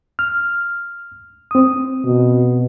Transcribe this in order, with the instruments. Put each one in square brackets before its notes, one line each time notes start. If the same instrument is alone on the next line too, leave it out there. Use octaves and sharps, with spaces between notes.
[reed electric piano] F6
C4 D#6
[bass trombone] B2